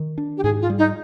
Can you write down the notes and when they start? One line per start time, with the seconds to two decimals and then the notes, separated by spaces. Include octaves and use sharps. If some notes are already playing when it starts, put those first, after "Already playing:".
Already playing: D#3
0.18 D4
0.37 G4
0.43 G#2 G#4
0.61 F4
0.70 G3
0.78 D#4